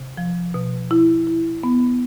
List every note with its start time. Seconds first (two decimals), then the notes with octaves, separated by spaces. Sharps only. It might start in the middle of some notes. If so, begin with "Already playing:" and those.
Already playing: C3
0.17 F3
0.54 B2
0.91 E4
1.27 E4
1.63 B3